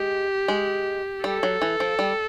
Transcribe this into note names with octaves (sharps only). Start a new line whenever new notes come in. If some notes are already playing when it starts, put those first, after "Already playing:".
Already playing: G#3 G4
G#3
G3 A4
F#3
E3
F3
G3